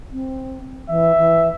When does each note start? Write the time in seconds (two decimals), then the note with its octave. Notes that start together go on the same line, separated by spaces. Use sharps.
0.12 C4
0.89 E3 E5
1.18 E3